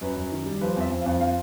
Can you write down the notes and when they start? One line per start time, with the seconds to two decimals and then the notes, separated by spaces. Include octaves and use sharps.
0.01 F#2 B4
0.16 F#2
0.32 D#3
0.46 G3
0.61 F3 B4
0.77 F2 E5
0.91 F2
1.01 F5
1.06 F2
1.20 F3 F5